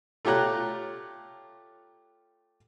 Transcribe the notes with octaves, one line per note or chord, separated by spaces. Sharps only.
A3 F4 G4 C#5 A#5 F#6